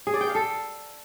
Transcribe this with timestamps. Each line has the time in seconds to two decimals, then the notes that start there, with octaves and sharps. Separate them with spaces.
0.07 G#4
0.14 D5
0.21 G5
0.28 F5
0.35 A4